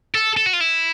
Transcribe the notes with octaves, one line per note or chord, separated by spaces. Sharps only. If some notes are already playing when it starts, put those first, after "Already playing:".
A4
A4
F#4
F4
E4